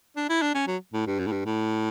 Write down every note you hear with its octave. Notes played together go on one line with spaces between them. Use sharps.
D4
E4
D4
C#4
F#3
A2
G2
F#2
A2
G2
A2